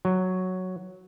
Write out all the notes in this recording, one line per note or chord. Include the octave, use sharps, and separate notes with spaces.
F#3